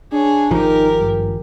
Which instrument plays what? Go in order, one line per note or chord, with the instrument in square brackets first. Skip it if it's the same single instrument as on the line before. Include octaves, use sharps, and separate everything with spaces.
[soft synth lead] D4 [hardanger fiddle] G#4 C#5
[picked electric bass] G#1 F3 [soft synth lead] D#4 [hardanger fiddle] G4 A#4
[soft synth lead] G2